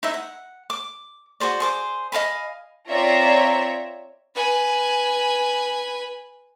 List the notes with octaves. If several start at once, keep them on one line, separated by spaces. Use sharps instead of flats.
D#4 E4 E5
F#5
D6
F#4 G#4 C5 D5
G#4 C5 D6
D#5 F5 G#5 B5
C4 F4 C#5 D5 E5 A#5
B4 G#5